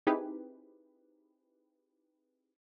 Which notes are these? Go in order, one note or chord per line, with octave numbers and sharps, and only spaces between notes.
C4 D#4 E4 G4 G#4 B4